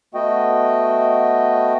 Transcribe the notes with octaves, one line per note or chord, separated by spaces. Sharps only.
A3 B3 F#4 D#5 G5